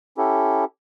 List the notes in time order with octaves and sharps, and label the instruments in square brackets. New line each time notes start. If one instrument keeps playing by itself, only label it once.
[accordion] C#4 E4 G4 A4